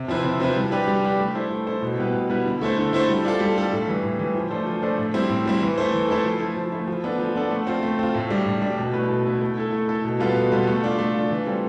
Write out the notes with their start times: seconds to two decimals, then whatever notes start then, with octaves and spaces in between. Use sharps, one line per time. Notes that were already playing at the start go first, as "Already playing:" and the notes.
Already playing: C3
0.08 F3 C4 E4 B4
0.24 C3
0.40 F3 C4 E4 B4
0.56 G3
0.72 D4 G4 B4
0.87 G3
1.03 D4 G4 B4
1.19 A3
1.35 E4 A4 C5
1.51 A3
1.67 E4 A4 C5
1.82 B2
1.98 G3 B3 E4 B4
2.14 B2
2.30 G3 B3 E4 B4
2.45 D3
2.61 A3 E4 A4 C5
2.77 D3
2.93 A3 E4 A4 C5
3.09 G3
3.25 D4 F4 A4
3.40 G3
3.56 D4 F4 A4
3.72 A2
3.88 E3 G3
4.03 A2
4.19 E3 G3
4.35 F3
4.51 A3 D4 A4 C5
4.66 F3
4.83 A3 D4 A4 C5
4.98 A2
5.14 G3 C4 E4
5.30 A2
5.46 G3 C4 E4
5.62 E3
5.78 A3 E4 A4 C5
5.94 E3
6.09 A3 E4 A4 C5
6.24 F3
6.40 A3 E4
6.56 F3
6.72 A3 E4
6.88 F3
7.04 B3 D4 A4
7.19 F3
7.36 B3 D4 A4
7.51 A3
7.67 C4 F4
7.83 A3
7.99 C4 F4
8.15 A2
8.30 G3 D4
8.46 A2
8.62 G3 D4
8.78 B2
8.93 A3 E4 B4
9.09 B2
9.25 A3 E4 B4
9.41 A3
9.57 E4 A4
9.72 A3
9.88 E4 A4
10.04 B2
10.20 G3 B3 F4 A4
10.36 B2
10.52 G3 B3 F4 A4
10.67 A3
10.83 D4 F4
10.99 A3
11.14 D4 F4
11.30 E3
11.46 G3 C4 F4 A4